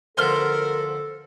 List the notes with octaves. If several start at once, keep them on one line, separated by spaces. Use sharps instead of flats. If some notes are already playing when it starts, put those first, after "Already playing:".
D2 F3 B3 A4 A#4 C5 C6 F6